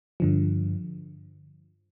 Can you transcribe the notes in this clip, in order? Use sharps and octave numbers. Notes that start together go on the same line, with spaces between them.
G2 D3 F3